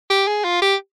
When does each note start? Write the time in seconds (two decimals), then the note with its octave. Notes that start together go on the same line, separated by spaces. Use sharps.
0.10 G4
0.27 G#4
0.45 F4
0.62 G4